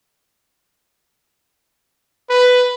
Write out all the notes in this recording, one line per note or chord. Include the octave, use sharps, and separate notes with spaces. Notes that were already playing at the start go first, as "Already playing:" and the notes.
B4